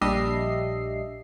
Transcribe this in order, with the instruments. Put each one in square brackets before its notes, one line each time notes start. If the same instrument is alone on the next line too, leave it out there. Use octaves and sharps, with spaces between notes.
[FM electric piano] A#1 G3 D4 D#5 E5 C7